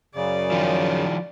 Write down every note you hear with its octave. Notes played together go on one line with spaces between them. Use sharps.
F#2 C#3 D5
D#3 F3